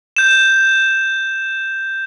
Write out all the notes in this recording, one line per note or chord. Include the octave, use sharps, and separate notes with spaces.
G6 E7